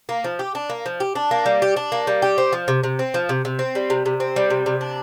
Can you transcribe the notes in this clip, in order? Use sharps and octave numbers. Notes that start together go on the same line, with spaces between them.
A#3
F3
G4
D4
A#3
F3
G4
D4
A#3
G3
G4
D4
A#3
G3
G4
C4
F3
C3
C3
C4
F3
C3
C3
C4
G3
C3
C3
C4
G3
C3
C3
D4